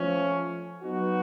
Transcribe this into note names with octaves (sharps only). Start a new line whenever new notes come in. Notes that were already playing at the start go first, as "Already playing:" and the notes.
Already playing: F3 A3 C#4
F#3 B3 D#4 F#4